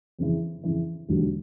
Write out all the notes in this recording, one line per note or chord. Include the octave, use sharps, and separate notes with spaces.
F2 C#3 E3
F2 C#3 E3
E1 D#2 D3 F#3